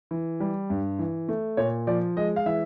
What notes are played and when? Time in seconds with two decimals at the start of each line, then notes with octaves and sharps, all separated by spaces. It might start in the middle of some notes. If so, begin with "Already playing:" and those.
0.11 E3
0.40 G3
0.70 G2
0.99 E3
1.29 A3
1.57 A#2 C#5
1.87 F3 D5
2.17 G#3 D#5
2.36 F5
2.46 E3 E5